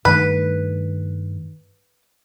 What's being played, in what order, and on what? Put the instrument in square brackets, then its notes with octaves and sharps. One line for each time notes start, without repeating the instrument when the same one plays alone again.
[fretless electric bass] G2 D#3 A3 [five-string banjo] B4